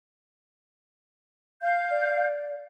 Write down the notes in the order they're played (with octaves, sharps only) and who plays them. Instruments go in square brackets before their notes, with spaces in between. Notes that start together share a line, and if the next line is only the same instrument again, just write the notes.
[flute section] F5 G6
[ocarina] D5